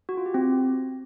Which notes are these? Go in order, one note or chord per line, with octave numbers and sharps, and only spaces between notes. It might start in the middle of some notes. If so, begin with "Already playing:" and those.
F#4
F4
G4
C4